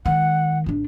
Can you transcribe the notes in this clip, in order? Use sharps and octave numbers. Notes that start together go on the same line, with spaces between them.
D#3 G#3 F#5
G#1 D4